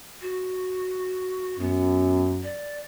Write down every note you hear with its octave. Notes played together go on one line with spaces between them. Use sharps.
F#4
F#2 B3
D5